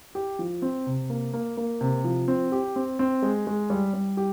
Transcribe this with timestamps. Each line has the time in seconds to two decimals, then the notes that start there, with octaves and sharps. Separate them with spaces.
0.15 G4
0.39 F3
0.62 C4
0.86 C3
1.10 A#3
1.33 A#3
1.57 A#3
1.81 C3
2.04 F3
2.28 C4
2.52 G4
2.76 C4
2.99 C4
3.23 G#3
3.47 G#3
3.70 G3
3.94 G3
4.17 G4